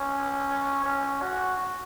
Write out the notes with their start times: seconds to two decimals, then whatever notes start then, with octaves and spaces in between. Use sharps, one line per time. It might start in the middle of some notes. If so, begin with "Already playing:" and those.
Already playing: C#4
0.85 C#4
1.22 F#4